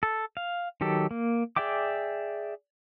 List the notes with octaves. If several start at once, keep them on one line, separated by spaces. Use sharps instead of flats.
A4
F5
D#3 F#3 G4 A4
A#3
G#4 D5 E5 G5 D6